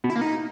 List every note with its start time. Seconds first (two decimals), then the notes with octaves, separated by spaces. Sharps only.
0.04 B2
0.10 E4
0.15 A#3
0.21 D#4